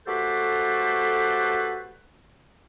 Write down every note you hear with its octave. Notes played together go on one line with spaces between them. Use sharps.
A3 F#4 G4 A4 B4 C5